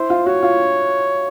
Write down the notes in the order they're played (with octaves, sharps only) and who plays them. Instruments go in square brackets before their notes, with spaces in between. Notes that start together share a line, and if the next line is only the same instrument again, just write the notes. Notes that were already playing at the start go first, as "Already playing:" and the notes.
Already playing: [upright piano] E4 [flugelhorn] C5
[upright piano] F4
[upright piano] F#4 [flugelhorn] C#5
[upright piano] F4